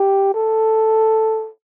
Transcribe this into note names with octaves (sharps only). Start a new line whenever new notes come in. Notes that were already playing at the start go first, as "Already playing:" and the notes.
Already playing: G4
A4